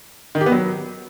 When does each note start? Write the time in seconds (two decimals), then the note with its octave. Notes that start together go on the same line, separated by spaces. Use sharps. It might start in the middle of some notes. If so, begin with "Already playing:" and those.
0.35 D#3
0.41 G4
0.46 B3
0.52 F#3